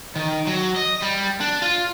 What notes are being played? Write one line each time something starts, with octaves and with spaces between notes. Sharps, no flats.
D#3
F#3
D#5
G3
D4
F4